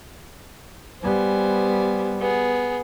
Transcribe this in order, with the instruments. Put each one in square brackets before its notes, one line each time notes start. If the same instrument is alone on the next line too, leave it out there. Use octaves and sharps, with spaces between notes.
[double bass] G3 B3 [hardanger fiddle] C5 G#5
[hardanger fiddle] B3 G#4